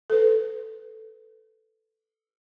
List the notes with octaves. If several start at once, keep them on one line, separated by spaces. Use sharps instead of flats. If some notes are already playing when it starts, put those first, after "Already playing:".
A4 B4